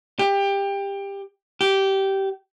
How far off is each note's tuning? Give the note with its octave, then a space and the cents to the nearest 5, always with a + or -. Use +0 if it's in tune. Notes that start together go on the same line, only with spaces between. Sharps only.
G4 +20
G4 -15